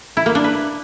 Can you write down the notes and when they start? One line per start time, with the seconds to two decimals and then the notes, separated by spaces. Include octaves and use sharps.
0.17 E4
0.26 A#3
0.35 D4
0.44 B4